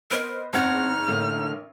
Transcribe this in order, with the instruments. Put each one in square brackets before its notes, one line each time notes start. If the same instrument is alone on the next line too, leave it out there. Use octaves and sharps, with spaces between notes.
[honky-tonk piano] B3 C5 D#5 [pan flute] A#4
[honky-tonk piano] F#1 E2 G#6 [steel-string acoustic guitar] C4 F#5 [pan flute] D#4 [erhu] F6
[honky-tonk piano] A1 A#3 [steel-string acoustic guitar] A2 D3